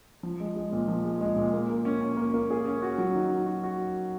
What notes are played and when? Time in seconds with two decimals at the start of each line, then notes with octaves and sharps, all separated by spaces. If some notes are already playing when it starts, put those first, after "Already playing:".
0.23 F3
0.40 G#3
0.56 G#3
0.72 A#2
0.88 F3
1.05 G#3
1.21 G#3
1.36 A#2
1.53 A#3
1.68 A#3
1.85 C#4
2.01 C#4
2.17 A#3
2.34 A#3
2.50 G#4
2.65 C#4
2.82 F#4
2.98 F#3
3.15 D#3
3.31 D#3
3.46 F#4
3.64 F#4